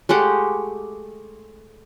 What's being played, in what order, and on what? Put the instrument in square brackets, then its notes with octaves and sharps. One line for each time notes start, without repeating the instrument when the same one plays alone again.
[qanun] G#3 A3 G4 F#5